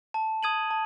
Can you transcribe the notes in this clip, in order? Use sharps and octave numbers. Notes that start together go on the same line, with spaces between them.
A5
D#6 G#6 D#7 F#7
A5